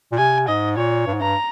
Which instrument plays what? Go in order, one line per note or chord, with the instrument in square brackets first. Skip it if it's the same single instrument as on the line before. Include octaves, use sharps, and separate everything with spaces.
[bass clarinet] A#2
[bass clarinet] C3 [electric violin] G#5
[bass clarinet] G#2 [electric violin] D#5
[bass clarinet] A#2 [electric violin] C#5
[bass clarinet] G2
G#2
[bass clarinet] G2 [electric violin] A#5